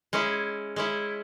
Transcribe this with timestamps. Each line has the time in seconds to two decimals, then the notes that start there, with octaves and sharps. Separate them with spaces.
0.13 G#3 C#4 E4
0.76 G#3 C#4 E4